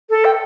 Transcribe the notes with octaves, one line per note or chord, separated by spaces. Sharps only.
A4
G5